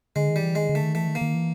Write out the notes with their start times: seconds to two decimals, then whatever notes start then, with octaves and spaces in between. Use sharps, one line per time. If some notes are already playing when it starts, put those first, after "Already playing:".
0.16 D3 G#3
0.29 D#3
0.36 G3
0.42 E3
0.55 D#3 G#3
0.69 D3
0.75 A3
0.82 D#3
0.95 E3 A3
1.08 D#3
1.15 A#3
1.21 D#3
1.35 E3